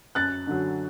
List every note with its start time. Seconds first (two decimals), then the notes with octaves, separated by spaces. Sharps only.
0.15 F#2 F#6 A6
0.47 D3 F#3